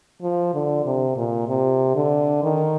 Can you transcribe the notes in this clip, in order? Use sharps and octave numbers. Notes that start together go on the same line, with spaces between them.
F3
D3
C3
A#2
C3
D3
D#3